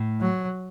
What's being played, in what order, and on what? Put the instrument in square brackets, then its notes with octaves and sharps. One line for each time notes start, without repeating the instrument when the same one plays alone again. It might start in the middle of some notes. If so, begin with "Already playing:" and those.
Already playing: [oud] A2
[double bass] F#3